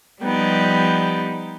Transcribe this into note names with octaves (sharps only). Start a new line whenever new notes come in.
F3 G3 B3 D#4 G4